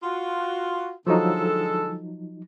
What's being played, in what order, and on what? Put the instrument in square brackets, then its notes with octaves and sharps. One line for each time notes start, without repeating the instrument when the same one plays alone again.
[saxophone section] F4 F#4
[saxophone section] D3 G#3 A4 [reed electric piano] F3 F#3 D#4